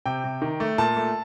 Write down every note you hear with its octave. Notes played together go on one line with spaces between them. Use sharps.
C3 G5
C3
D#3
A3
A#2 A5
A3